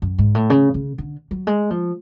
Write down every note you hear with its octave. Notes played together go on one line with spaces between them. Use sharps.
F#2
G#2
A2
C#3
C#3
D3
F#3
G#3
F3